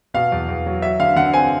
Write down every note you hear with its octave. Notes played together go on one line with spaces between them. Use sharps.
B2 F5
E2
E2
F#3
F#3 E5
D3 F5
D3 F#5
C4 G#5